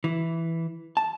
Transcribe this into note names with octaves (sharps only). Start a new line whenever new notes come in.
E3
A5